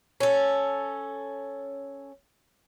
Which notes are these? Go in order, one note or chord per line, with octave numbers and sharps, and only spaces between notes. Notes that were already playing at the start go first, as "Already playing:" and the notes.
C#4 A4